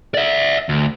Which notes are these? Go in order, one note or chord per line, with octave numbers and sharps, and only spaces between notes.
D5 E5
D2